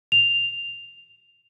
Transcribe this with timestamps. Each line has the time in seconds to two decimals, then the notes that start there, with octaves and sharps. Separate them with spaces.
0.12 F7